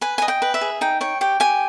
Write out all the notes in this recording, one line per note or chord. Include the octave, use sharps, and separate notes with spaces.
B4 G#5
D#5 G#5
G5
B4
E5
G#4
D#4 G5
C#5 G5
G4 G5
G4 G#5